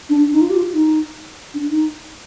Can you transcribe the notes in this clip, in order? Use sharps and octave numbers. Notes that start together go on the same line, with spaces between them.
D4
D4
D#4
F4
G4
F4
D#4
D4
D#4